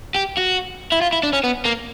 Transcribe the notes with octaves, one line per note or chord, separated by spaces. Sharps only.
G4
F#4
E4
F4
E4
D4
C#4
B3
A#3